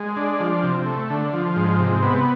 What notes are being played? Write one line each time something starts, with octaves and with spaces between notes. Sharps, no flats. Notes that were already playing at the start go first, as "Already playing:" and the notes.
Already playing: G#3
D4
F3
C3
A3
D3
F3
G#2
C3
B3